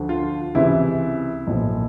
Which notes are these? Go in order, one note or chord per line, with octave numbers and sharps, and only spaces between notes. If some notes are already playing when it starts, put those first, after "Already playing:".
Already playing: D2 D3 F3
F4
C#2 C3 E3 E4
B1 A#2 F3